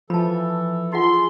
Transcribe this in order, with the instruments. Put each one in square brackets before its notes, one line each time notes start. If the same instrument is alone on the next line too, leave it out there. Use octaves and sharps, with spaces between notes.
[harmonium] E3 A4 [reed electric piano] F3 [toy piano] A5 B5
[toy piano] D#4 F4 F#5 [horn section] G#4 C6